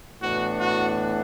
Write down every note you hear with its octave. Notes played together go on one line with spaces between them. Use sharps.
A2 E3 B3 D4 F#4
F#4